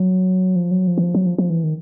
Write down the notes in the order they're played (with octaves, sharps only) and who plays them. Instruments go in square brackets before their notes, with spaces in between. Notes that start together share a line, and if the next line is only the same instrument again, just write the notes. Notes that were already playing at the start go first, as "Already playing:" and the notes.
Already playing: [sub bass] F#3
F3
F#3
F3
E3
F3
F#3
F3
F3
E3
D#3